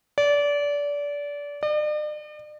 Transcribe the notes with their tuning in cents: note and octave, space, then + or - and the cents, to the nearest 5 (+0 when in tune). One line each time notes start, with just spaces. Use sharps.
D5 -25
D5 +45